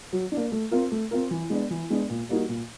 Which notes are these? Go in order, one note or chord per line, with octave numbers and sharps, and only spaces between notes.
F#3
D4
A#3
A3
C4 F4 A#4
A3
C4 F4 A#4
E3
G#3 B3 D4
E3
G#3 B3 D4
A#2
G3 A#3 D#4 F#4
A#2